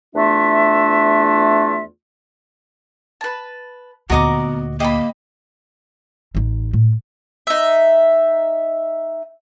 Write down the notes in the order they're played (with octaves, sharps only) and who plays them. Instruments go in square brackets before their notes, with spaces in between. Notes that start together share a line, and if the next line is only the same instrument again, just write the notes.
[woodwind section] E2 A3 D4 F4 E5
[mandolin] B4 A5
[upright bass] D2 A#2 [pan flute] B3 [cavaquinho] F#4 D#5 D6 [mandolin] A#4 A#5
[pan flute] A#3 [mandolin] G4 B5 [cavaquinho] D#5
[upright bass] A1 D#4
A2
[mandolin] D#4 E5